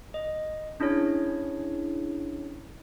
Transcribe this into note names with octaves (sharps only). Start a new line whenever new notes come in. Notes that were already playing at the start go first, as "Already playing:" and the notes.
D#5
C#4 D4 E4 G#4 C#5